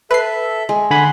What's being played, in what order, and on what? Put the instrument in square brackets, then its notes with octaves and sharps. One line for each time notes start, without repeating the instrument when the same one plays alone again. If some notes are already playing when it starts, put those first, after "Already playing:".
[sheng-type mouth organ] A4 E5 [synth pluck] B4 C7
[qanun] G#3
[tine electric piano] D3 G#5 B5 [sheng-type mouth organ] F#5 C6